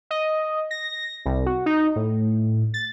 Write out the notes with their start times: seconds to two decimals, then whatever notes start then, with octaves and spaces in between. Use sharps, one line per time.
0.11 D#5
0.71 A#6
1.25 C2
1.46 F#4
1.66 D#4
1.96 A2
2.74 A6